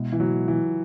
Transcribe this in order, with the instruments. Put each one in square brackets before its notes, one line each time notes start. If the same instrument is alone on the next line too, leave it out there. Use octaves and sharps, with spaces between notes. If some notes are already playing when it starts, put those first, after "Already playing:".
Already playing: [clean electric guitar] B2 G#3 E4
[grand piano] E3
F#3
E3